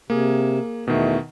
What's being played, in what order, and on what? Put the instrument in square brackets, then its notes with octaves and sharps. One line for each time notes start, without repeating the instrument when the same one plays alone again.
[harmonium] C3 [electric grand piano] A#3 G#4
[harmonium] E2 A3 [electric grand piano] B2 D#3